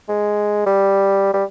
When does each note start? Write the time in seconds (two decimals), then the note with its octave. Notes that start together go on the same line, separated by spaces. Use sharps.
0.09 G#3
0.66 G3
1.33 G3